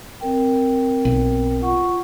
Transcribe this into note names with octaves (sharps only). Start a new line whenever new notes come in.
C4 A#4 G5
B1
F4 F#5 C#6